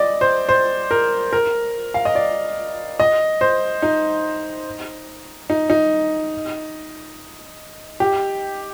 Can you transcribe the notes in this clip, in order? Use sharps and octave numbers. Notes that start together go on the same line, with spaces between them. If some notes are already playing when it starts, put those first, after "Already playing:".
Already playing: D5 D#5
C5
C5
A#4
A#4
F5
D#5
D5
D#5
C5
D#4
D#4
D#4
G4